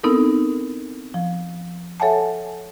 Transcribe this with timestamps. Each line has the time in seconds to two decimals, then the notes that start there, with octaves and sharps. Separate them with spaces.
0.04 B3 C4 D#4 E4 A4 A#4
1.14 F3
2.00 A4 C#5 E5 F#5 G#5 A5